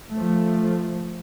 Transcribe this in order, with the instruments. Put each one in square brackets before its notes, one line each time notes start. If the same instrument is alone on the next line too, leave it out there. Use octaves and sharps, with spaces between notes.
[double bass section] F3 A3